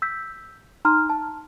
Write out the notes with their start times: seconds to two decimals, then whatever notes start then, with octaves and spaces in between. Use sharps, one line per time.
0.02 E6 G6 B6
0.85 D#4 A#5 C6 F6
1.09 A5